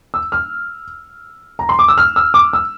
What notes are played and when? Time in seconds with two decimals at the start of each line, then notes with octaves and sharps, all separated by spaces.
0.14 E6
0.32 F6
1.59 A#5
1.69 C6
1.79 D6
1.88 E6
1.98 F6
2.16 E6
2.34 D6
2.53 E6